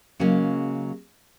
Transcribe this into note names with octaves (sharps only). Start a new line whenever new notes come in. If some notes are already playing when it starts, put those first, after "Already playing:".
C#3 F#3 G#3 A#3 C#4